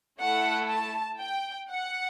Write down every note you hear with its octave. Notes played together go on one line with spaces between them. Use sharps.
A3 E4 A4 F#5
A5
G5
F#5